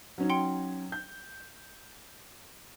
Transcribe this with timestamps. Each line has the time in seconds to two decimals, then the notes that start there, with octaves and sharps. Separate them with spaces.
0.18 F#3 C#4 D#4
0.30 G5 C6 C#7
0.92 G6